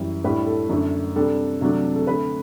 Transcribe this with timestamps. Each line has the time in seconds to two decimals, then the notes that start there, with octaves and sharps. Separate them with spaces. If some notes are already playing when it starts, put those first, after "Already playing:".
Already playing: F#2 E3 G3
0.24 A2 G3 D4 B4
0.47 A4
0.69 F#2 D3 A3 D4
1.15 C3 G3 D4 A4
1.61 C3 F#3 A3 D4
1.96 A4
2.07 D3 A3 C4 B4